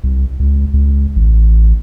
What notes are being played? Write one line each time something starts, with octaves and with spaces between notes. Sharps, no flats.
C2
C#2
C#2
A1